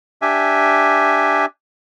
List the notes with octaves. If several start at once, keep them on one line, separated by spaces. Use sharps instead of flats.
D4 G4 E5 G#5